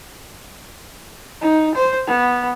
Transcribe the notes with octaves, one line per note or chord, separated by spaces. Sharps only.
D#4
C5
B3